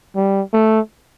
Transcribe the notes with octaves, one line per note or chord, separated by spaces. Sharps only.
G3
A3